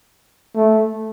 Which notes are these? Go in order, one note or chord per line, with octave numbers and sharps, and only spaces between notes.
A3